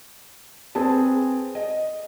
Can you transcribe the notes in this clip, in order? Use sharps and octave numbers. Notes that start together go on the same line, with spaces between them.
C4 G#4 B4 A5
D#5